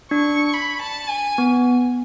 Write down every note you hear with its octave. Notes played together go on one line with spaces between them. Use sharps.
D4 C#6
B5
A5
G#5
B3